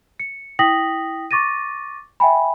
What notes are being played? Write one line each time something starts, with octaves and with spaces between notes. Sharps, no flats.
C#7
E4 G5 D#6 A#6 B6 F#7
C#6 D6 A6 A#6 D#7
E5 G5 G#5 B5